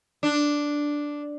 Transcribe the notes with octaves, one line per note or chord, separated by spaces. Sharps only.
D4